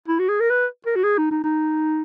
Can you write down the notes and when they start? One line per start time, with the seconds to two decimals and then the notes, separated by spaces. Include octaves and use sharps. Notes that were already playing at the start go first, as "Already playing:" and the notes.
0.08 E4
0.19 F#4
0.29 G#4
0.40 A#4
0.50 B4
0.86 A#4
0.95 F#4
1.04 G#4
1.17 D#4
1.31 D#4
1.44 D#4